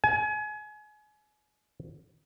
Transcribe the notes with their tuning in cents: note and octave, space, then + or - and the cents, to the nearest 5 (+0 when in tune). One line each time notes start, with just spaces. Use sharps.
G#5 +30